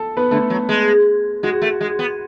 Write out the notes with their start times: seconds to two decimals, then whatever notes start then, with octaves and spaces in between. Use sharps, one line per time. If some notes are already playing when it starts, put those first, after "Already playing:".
Already playing: A4 A5
0.17 B3 B4
0.31 D3 A3 A4
0.50 F#3
0.69 G#3
1.43 G#3 F#4
1.62 A3
1.81 G#3
1.99 B3